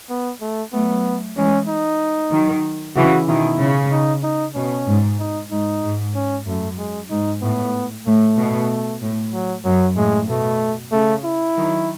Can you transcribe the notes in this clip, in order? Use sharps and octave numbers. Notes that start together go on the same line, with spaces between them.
B3
A3
F#3 A3 B3
E3 G#3 C#4
D#4
D#3 F#3
C#3 E3 F#4
B2 D#3 E4
C#3
D#4
D#4
B2 C#4
G#2
D#4
G#2 D#4
G#2
C#4
F#2 A3
G#3
G#2 D#4
A2 B3
A2 A3
B2
A2
F#3
F#2 F#3
A2 G#3
B2 A3
C#3 A3
E4
D#3 F#3